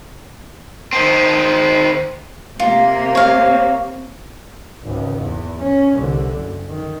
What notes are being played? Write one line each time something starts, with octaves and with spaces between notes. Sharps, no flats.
D#3 C4
C3 A#3 F4
C#5 F5
G#1 C#2
E2
C#4
C2 D3
F#1
D#3